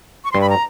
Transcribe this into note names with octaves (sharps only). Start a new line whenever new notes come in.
C#6
G2 C6
B5
A#5